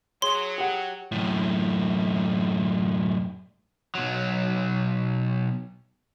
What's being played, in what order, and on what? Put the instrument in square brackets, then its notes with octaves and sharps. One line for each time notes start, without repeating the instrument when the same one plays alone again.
[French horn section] F#3 [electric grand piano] G#4 C#5 [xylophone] C6
[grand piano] G4 F#5
[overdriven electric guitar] F#2 A2
B1 F#3